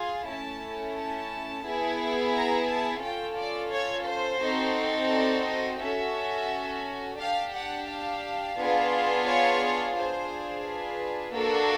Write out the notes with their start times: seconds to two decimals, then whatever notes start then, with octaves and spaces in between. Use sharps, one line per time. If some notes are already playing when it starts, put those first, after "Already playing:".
Already playing: F4 G#4
0.25 A3 C#4 E4 A5
0.94 A5
1.64 B3 E4 G#4
2.34 A#5
2.68 A5
3.02 C#4 F4 A4 G5
3.37 D5
3.72 C#5
4.06 C5
4.41 C4 D#4 F#4 A4
5.10 D5
5.45 D#5
5.79 C#4 F#4 A4 E5
7.18 D4 G4 F5
7.53 F#5
7.87 F5
8.57 B3 D4 F4 G#4
9.26 C#5
9.95 D4 F4 G#4 C5
10.65 B4
11.33 A#3 D4 F#4 A4